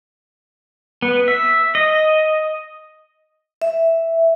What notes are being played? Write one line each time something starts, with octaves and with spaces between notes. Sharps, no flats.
B3
E5
D#5
E5